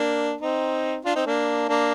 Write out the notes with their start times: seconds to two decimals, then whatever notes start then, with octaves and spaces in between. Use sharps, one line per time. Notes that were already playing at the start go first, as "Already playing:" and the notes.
Already playing: A#3 D4
0.41 C4 D#4
1.05 D4 F4
1.16 C4 D#4
1.26 A#3 D4
1.68 A#3 D4